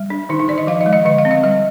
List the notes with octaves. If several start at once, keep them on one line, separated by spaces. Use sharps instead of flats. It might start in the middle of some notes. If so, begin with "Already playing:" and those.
Already playing: G3
D4
D#3 D#4
D#4
D#3 D5
D#5
F3 F5
D#5
G#3
D#5
D3 D#5
F5
C4
D#5
G3 D#5